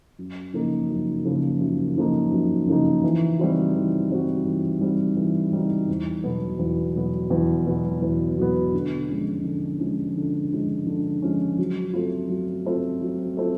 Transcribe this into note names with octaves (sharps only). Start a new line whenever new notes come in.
F#2
C#3 F3 A#3 D#4
F#2
C#3 F3 A#3 D#4
F#2
C#3 F3 A#3 D#4
F#2
C#3 F3 A#3 D#4
E3
G3 C4 D#4 F#4
E3
G3 C4 D#4 F#4
E3
G3 C4 D#4 F#4
E3
G3 C4 D#4 F#4
E2
B2 F#3 B3
E2
B2 F#3 B3
E2
B2 F#3 B3
E2
B2 F#3 B3
D3
F3 G#3 C#4
D3
F3 G#3 C#4
D3
F3 G#3 C#4
D3
F3 G#3 C#4
F#3
A3 C4 F4
F#3
A3 C4 F4
F#3
A3 C4 F4